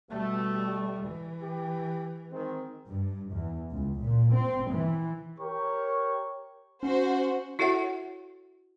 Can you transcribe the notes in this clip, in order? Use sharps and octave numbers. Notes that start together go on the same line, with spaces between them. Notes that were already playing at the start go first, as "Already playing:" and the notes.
B2 G3 A3
E3
G4
D#3 G#3 C4
G2
E2
C#2
A#2
C4
E3
G4 A#4 C#5 C#6
C#4 F#4 C5
E4 F#4 A4 C#5 E5 F#5